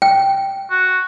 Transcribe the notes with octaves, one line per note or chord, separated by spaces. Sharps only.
G5
F#4